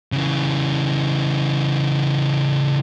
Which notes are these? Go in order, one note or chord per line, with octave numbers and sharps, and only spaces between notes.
C#3 E3